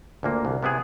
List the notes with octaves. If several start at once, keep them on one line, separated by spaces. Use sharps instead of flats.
D2 A#2 A#3
C2
C3 B3 E4 G#4